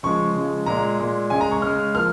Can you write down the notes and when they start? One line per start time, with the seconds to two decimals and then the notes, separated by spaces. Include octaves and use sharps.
0.03 C#3 F3 G#3 C#6
0.36 C#3 F3 G#3
0.66 A#2 G#3 A#5
0.99 A#2 G#3
1.30 C#3 G#3 G#5
1.41 A#5
1.51 C#6
1.62 C#3 G#3 F6
1.95 F3 A#3 F6